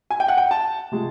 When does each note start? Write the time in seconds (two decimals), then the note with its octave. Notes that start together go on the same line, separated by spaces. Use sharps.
0.10 G#5
0.20 G5
0.28 F#5
0.37 G5
0.51 A5
0.92 C3 F3 G#3